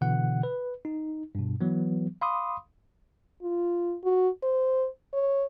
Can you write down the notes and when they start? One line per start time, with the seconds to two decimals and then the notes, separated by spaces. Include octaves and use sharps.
0.01 B2 D3 E3 F#5
0.43 B4
0.85 D#4
1.35 G2 B2
1.61 E3 F#3 B3
2.21 F5 B5 C6 D6 D#6
3.42 F4
4.04 F#4
4.43 C5
5.13 C#5